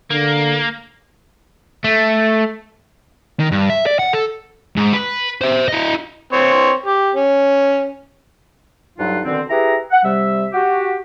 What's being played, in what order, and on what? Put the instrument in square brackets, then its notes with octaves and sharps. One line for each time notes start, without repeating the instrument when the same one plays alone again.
[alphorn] D3 [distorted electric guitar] A#3
[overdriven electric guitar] A3
[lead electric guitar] D#3
G2
E5
D5
F#5
A4
[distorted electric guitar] G#2
B4
C5 E5
E4 D#5
[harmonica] C4 C#5
G4
C#4
[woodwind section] D2 G2 F#3 D#4 F4 F#5
B2 D3 D#3 C4
E4 G4 G#4 B4 A#5
F#5
C3 G3 E5
F#4 G4